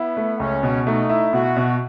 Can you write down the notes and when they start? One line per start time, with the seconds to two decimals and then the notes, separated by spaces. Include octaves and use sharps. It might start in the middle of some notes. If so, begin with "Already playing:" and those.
Already playing: B3 E4
0.17 A3
0.39 C#2 C#4
0.63 B2
0.87 A3 D#4
1.10 E4
1.33 B2 F#4
1.57 B2